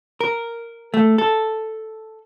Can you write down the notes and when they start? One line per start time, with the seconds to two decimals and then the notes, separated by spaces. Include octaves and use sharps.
0.21 A#4
0.94 A3
1.18 A4